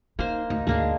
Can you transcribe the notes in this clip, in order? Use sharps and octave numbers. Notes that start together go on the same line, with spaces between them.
A#3 D#4 C5
D2 D#4
D2 G#2 G#3 A#3 D4